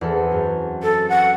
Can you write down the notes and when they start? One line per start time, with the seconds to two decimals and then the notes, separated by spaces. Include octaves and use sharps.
0.01 E2 C4 A4
0.31 F#2
0.83 A4
1.09 F#5